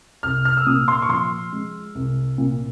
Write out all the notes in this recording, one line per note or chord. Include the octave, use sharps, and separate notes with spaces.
C2 F6
F6
E6
A#2 D#6
C6
C#6
F3 C6
G#3
C2
A#2